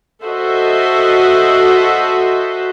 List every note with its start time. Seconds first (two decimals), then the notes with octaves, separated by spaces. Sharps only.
0.23 F#4 A4 C5 D#5 E5 F#5